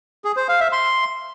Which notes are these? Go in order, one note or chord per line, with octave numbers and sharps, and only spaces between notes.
G#4
C5
F5
E5
C6